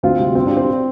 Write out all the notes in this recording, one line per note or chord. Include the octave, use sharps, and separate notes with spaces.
D2 C4 F4
C3 G3
G2 C4 F4
D4
G3
C4